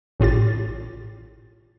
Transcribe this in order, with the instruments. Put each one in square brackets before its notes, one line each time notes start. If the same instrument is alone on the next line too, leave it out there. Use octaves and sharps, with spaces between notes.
[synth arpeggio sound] A1 A2 F4 G4 A6